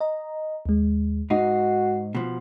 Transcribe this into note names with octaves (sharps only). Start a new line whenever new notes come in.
D#5 A#5
D#2 G#3
G#2 D#4 F#4 C7
B2 F3